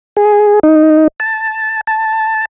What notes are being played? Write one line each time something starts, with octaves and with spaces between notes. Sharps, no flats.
G#4
D#4
A5
A5